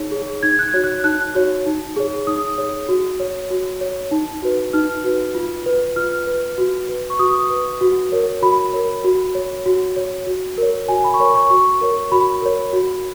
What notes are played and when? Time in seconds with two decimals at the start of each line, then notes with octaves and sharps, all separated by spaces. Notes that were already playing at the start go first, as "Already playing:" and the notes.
Already playing: D#4 G#4 C#5
0.12 G#4 C#5
0.43 D#4 G#6
0.59 F#6
0.63 G#6
0.74 F#4 C#5
0.84 F#6
1.04 D#4 F#6
1.35 F#4 C#5
1.66 D#4
1.96 G#4 C#5
2.27 D#4 D#6
2.58 G#4 C#5
2.89 F#4
3.20 C#5
3.50 F#4
3.81 C#5
4.11 D#4
4.43 F#4 B4
4.73 D#4 F6
5.04 F#4 B4
5.35 F4
5.66 B4
5.96 F4 F6
6.27 B4
6.58 F#4
6.89 B4
7.10 C#6
7.19 F#4 D#6
7.50 B4
7.81 F#4
8.12 A#4 C#5
8.42 F#4 B5
8.73 A#4 C#5
9.04 F#4
9.35 C#5
9.66 F#4
9.96 C#5
10.27 F#4
10.58 A#4 C#5
10.88 F#4 G#5
11.04 B5
11.14 C#6
11.19 A#4 C#5 B5
11.35 C#6
11.50 F#4 C#6
11.81 A#4 C#5
12.12 F#4 B5
12.42 A#4 C#5
12.73 F#4